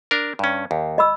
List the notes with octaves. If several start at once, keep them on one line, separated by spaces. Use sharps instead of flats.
D4 A#4
G2 C#4
D#2
D#5 B5 E6